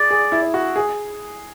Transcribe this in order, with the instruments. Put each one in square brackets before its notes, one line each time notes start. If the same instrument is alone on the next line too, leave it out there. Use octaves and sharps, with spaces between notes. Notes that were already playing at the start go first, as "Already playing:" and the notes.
Already playing: [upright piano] G#4 [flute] D5
[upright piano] G#4
E4
F#4
G#4